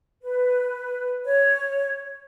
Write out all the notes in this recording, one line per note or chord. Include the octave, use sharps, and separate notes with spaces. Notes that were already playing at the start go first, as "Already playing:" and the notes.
B4
C#5